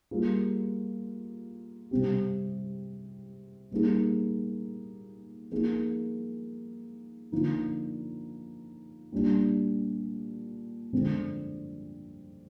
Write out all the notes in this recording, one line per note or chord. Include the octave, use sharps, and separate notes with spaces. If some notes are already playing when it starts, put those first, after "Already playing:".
G3 A#3 F4 G#4
C3 G3 C4 G4
A#2 G3 A#3 D#4 G#4
F3 A#3 D#4 G#4
D3 F3 A#3 D#4
A#2 G3 D4
D3 F3 G#3 C4